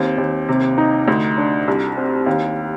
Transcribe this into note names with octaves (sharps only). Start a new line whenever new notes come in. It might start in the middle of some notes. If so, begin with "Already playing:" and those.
Already playing: D#2 C4
D#2
C3
D#4
D2
D4
C2
C4
D#2